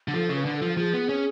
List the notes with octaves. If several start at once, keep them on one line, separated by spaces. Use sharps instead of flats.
D3
F3 A4
C#3
B4
D3
A4
F3
F3 G#4
B3
C#4